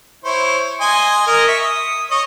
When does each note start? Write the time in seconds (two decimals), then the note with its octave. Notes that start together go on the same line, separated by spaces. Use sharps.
0.24 E4 C5 C#5
0.80 D#5 G#5 C6
1.27 A#4 D#5
1.47 E5 C#6
1.64 D#6
2.11 C#5 D#5